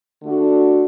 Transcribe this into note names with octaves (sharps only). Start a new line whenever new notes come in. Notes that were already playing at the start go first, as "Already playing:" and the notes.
D3 A3 D4 F#4